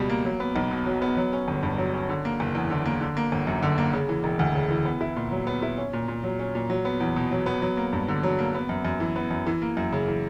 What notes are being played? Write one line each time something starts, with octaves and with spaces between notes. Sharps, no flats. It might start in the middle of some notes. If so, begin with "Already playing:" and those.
Already playing: C#2 B2 G3
A#3
F#3
B3
B1
B2
F#3
B3
F#3
C#4
G1
G2
F#3
C#4
D3
A#3
F#1
E2
D3
A#3
D3
A#3
G1
F#2
D3
A#3
C#3
E3
E1
D2
C#3
E3
B3
E4
A#2
F#3
B3
E4
C#4
A#2
A#2
F#3
C#4
A#2
F#3
B3
E2
B2
F#3
B3
F#3
A#3
G2
D3
F#3
A#3
B3
F#2
F#2
E3
B3
F#2
E3
A#3
F#2
C#3
E3